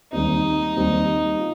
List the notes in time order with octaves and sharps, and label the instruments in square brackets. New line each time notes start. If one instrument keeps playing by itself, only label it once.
[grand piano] D#2 D#3 G3 C4 [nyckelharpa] D#4
[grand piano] D#2 D#3 G3 C4
F4